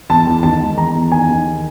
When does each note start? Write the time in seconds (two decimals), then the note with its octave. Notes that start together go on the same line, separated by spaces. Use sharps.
0.09 E2 A5
0.27 E2
0.43 D#2 A5
0.61 G#3
0.77 E2 A#5
0.95 E2
1.12 D#2 G#5
1.29 D#2